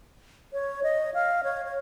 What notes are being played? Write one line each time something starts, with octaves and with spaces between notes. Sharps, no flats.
C#5
D#5
F5
C#5
C#5